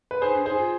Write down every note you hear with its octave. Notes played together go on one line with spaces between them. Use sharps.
B4
D#4 G#4 C5
D4
D#4 G#4 C5
F4